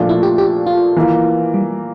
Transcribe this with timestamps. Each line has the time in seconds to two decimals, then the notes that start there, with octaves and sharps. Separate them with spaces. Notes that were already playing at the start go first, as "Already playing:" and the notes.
Already playing: A#2 F3 A3 D4
0.09 E4
0.23 G4
0.38 G4
0.67 F4
0.97 E3 A#3 F4
1.54 G3